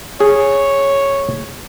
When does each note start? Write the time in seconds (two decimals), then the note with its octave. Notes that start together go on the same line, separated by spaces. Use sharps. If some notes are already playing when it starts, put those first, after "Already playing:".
0.20 G#4 C#5